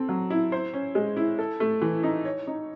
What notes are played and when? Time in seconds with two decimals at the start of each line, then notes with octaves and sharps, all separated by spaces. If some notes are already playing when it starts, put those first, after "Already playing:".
Already playing: C4 A4
0.09 F#3
0.30 E4
0.52 C5
0.73 C#4
0.95 G#3
1.17 E4
1.39 A4
1.60 A3
1.82 E3
2.03 D#4
2.25 C#5
2.47 D#4